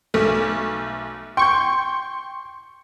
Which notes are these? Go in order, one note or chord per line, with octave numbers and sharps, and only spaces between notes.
B1 A3
G5 C6 C#6 G6